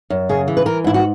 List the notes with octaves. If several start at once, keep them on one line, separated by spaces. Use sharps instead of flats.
F#2
C#3 G#4
E3
B4
E3 A#4
G#2 E4
F#4